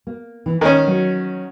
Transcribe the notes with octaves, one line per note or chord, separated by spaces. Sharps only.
A#3
E3
D#3 A#3 C#4
F#3 C#5